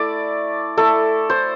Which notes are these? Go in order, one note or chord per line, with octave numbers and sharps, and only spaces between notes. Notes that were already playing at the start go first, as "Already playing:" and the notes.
Already playing: A3 E4 D5
A3 E4 A4
C5